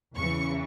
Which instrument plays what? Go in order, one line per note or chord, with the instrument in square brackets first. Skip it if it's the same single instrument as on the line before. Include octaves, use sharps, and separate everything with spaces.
[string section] E2 C#3 E3 C#6